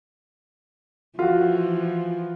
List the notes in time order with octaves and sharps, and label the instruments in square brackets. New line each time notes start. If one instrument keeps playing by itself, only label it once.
[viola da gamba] E3 F3 [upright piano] F4 F#4